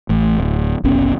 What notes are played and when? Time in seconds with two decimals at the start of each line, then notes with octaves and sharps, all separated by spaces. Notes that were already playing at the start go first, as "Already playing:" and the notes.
0.09 A1 A2
0.38 D1
0.84 F#1 C2 B3 C#4